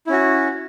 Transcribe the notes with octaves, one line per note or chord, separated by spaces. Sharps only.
C#4 E4 F#4